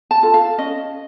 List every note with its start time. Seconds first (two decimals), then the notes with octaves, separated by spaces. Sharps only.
0.11 A5
0.23 F4 A4
0.34 F5
0.58 C#4 D#5